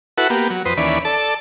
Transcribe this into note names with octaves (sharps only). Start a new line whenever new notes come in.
E4 F#4 A4 B4 F#5
A#3 B3 G4
F#3
F2 B4 C5 D#6
D#2 E3 C#4 D5 B5
A4 D5 A5